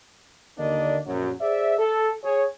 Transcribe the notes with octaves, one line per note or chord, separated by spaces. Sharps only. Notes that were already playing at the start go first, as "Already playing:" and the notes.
D#2 D3 A#3 D4 D5 D#5
A#1 F#2 F#3
G#4 C5 D5 E5
A4
G#4 C#5